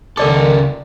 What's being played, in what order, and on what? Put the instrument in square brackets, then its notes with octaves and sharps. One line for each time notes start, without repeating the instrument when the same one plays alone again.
[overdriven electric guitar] C#2 A4 [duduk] D#3 [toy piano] A#4 D5 D6